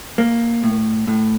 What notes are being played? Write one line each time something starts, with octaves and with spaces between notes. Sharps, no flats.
A#3
A2
A2